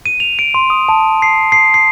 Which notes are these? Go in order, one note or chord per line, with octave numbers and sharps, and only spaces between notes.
D#7
F7
D7
C6
D#6
A5
C7
C7
C7